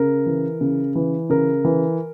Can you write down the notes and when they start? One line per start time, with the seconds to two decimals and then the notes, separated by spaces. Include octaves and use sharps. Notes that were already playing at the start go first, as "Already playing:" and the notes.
Already playing: C#3 A#4
0.26 E3
0.61 C#3
0.95 E3
1.30 C#3 A#4
1.65 E3